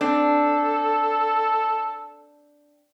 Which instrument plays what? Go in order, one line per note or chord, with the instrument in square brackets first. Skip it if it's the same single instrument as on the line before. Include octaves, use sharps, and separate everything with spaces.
[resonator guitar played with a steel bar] C4 D4 [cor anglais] A4